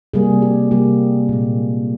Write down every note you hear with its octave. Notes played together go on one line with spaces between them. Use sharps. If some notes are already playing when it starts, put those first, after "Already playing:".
C3 G3 A#3 G#4
G4
C3 G3 A#3 G4
A#2 G#3